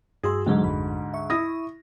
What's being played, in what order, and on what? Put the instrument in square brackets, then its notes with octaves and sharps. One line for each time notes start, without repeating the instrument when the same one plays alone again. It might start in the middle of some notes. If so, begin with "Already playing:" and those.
[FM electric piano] G2 F#4 E6 [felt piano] G#4 C6
[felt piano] D2 G#2 [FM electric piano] E3 F#3 G#3
[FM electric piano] A1 F2 B5
E5 C#6
[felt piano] E4 D#6 A#6